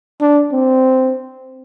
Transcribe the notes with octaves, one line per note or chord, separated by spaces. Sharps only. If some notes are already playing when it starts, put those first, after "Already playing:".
D4
C4